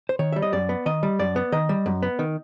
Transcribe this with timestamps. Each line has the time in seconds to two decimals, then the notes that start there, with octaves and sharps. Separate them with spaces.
0.09 C5
0.19 D#3 C#5
0.32 G3 E5
0.42 D#5
0.53 F#2 D5
0.69 B3
0.86 D#3 D#5
1.03 G3
1.19 F#2 D5
1.36 B3
1.52 D#3 D#5
1.69 G3
1.86 F#2
2.02 B3
2.19 D#3